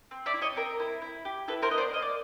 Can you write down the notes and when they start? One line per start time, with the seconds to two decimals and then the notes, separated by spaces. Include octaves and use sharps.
0.11 C4
0.26 D5 E5
0.34 E4
0.41 C#5 D#5
0.56 C4 A#4
0.80 E4
1.02 E4
1.25 G4
1.48 E4 A4 B4
1.62 A#4 C5
1.70 B3 D#5
1.78 C5 D5
1.93 A#3 D#5
2.02 D5